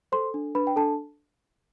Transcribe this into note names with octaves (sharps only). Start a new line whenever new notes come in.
A4 C5 C6
D4
D4 B4 B5
G5
D4 A4 A5